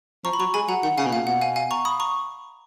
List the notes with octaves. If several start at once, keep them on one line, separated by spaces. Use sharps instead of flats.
F3 A#5 C#6
B5
F#3 A#5 C#6
G#3 G#5 B5
F#3 F#5 A#5
D#3 F#5
C#3 F5 G#5
B2
A#2 F5
B2 F#5
F5 G#5
F5 G#5
A#5 C#6
B5 D#6
A#5 C#6